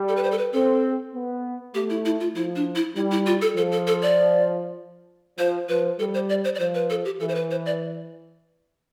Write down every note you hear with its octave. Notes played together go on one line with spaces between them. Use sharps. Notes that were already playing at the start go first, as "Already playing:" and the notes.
Already playing: G3
A4
B4
C5
A4
B4
C4 A4
B3
A3 G4
E4
E4
F4
F3 E4
D4
E4
G3 E4
E4
F4
A4
F3 A4
A4
A4
D5
F3 C5
F3 B4
G3 A4
C5
D5
C5
D5
F3 C5
B4
A4
G4
E3 A4
C5
B4
C5
D5